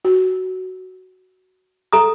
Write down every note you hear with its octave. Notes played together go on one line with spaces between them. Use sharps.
F#4
A4 A#5 D#6